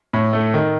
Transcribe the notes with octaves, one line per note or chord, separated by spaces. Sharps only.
A2
A3
D#3